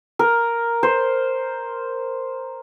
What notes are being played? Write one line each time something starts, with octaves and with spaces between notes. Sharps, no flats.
A#4
C5